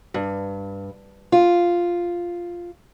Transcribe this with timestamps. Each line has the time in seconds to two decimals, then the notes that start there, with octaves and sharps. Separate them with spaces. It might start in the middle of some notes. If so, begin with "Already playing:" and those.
0.14 G2
1.32 F4